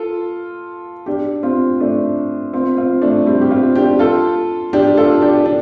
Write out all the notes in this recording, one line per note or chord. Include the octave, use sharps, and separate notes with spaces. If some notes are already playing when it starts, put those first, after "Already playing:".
Already playing: F4 A4
D4 G4
C4 F4
A3 D4
C4 F4
C4 F4
A3 D4
G3 C4
G4
C4 F4
D4 G4
F4 A4
D4 G4
F4 A4
D4 G4
D4